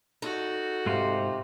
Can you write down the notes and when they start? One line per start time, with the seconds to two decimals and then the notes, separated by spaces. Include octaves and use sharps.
0.22 D#4 F#4 A4
0.86 G#2 C3 F4